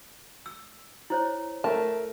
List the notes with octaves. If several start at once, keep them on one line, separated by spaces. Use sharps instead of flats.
E6
E4 C5 C#5
A3 A#4 A5